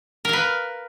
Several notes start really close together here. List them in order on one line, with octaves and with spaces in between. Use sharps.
A#4 F5 B4